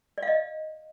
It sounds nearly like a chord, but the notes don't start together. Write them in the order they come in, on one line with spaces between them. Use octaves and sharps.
D5 F5 D#5